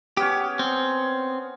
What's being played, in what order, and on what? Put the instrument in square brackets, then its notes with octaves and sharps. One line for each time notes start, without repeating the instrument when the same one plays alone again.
[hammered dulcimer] B3 C#4 C#5 [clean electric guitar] G4
[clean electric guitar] C4